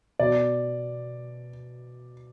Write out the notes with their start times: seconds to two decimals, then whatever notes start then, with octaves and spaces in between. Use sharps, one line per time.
0.19 B2 D5